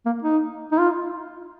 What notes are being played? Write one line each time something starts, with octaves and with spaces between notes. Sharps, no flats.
A#3
D#4
D#4
F4